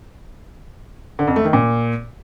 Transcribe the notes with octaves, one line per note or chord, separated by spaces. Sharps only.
D3
F2
A3
D#3
A#2